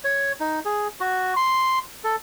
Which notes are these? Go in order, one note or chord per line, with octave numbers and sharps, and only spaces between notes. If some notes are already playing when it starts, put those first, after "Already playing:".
C#5
D#4
G#4
F#4
C6
A4